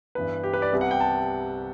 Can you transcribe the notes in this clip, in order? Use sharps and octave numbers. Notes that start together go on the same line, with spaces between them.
G2 E3 B3 B4
G4
B4
D5
C2 C3 G3 B3
F#5
G5
A5